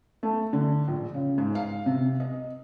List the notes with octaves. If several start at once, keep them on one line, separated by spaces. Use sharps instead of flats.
A3
D3
A#1
C#3
G#2
F5
C3
D#5